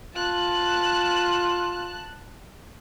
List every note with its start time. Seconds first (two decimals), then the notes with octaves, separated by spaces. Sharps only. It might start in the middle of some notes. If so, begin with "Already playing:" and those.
0.15 F4 A5 F#6